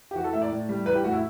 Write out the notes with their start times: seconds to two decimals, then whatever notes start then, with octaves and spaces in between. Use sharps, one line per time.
0.11 G4
0.15 E3 F#4
0.24 A4
0.33 A2 E5
0.42 D5
0.50 A2
0.69 G3
0.86 E3 B4
0.95 G4
1.04 A2 F#4
1.12 E4